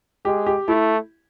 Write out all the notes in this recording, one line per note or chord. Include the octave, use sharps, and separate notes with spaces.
G#3 G4
G4
A3 E4